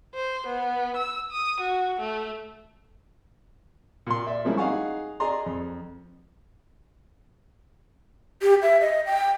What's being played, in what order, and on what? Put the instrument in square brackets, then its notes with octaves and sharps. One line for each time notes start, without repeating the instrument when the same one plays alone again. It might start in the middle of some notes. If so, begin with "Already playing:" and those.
[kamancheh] C5
B3
E6
D#6
F#4
A3
[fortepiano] A#2 C6
D5 E5
F3 G3 G#3 A#3 C#4 E4
D#4 G#4 F5 F#5 G#5 C#6
G#4 D5 D#5 A#5 C6
F2
[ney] G4
E5
D#5
G5